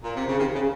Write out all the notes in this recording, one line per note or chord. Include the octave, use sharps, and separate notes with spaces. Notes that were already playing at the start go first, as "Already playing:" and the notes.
A#2
C3
C#3
C3 D#3
C#3